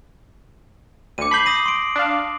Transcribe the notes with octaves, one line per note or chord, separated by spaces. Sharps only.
D2 D6 C#7 D#7
A5 B5 G6 C7 F#7
D#6 A#6 D#7
C6 D7
D4 F5